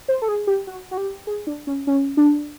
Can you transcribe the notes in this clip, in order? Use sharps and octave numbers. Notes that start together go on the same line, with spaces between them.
C5
A4
G#4
G4
F#4
F#4
G4
G#4
D4
C#4
C#4
D4